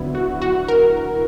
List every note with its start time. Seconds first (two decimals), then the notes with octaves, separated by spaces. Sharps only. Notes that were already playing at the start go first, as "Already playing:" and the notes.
Already playing: D2 D3 F#3 B3 E4
0.15 F#4
0.42 F#4
0.68 A#4